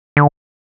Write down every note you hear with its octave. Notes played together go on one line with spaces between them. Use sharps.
D3